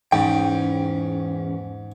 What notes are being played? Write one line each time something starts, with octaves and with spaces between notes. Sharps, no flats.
E2 G#2 C#4 G5